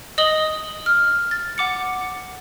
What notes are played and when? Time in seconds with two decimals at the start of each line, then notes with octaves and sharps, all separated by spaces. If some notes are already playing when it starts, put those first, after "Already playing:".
0.18 D#5 D#6 F#7 G7
0.86 F6
1.31 A6
1.58 F#5 D6 C#7